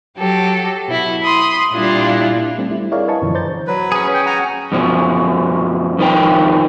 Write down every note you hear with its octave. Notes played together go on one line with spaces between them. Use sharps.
F#3 G4 A4
B2 E4
B5 C6 D#6
A#2 G3 D4 E4 F4
G3 A3 C4 D4
G3 E4
E4 G#4 A#4 C#5 D5 F5
B4 D#5 G#5 A5 C#6
F#2 B2 D3 E3 F3
C5 D5 A#5 G6 A6
F#3 B4
C#4 G#4
G5
F#5 G#5 A#5
F#2 B2 F3
F2 D#3 F3 B4 G5